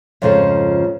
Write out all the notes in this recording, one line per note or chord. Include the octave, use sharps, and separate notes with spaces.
F2 G#2 C#3 F3 A4